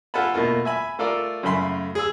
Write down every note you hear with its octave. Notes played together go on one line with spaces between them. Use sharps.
F4 A4 F#5 G#5 A5 B5
B2 A3 A#3 F4
E5 G#5 B5
A3 F4 A4 A#4 D5
F#2 C#3 A3 B5 C6
G#4 E6